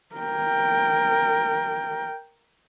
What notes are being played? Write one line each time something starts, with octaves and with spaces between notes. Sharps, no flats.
A#4 G5